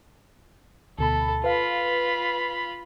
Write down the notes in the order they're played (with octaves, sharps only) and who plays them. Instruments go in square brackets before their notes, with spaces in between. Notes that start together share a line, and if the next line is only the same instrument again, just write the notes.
[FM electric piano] D2 B2 B5 [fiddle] A4
[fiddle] F4 B5 [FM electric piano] B4 F5